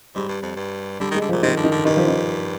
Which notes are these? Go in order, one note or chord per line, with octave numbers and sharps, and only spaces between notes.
G#2 G3
G2
F2
G2
D3 G3
D#3 G#3
D3
A#2 F3
C3 D#3
D3
D#3
D3
G2 D#3
F3
D#3